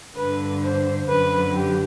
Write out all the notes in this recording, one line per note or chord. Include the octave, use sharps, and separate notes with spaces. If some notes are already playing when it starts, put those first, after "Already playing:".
G2 D3 B4
C5
F#2 D3 B4
G4